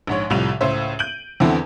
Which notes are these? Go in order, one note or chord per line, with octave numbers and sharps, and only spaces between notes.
A#1 G#2 C#5
C2 A2 F3 G3 F7
C#2 A2 C5 E5
G6 D7 D#7 F#7
E2 D3 C4 E4 A4 F#5